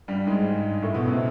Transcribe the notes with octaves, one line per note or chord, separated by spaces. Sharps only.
G2 G3
G#2 G#3
A2 A3
B2 B3
C3 C4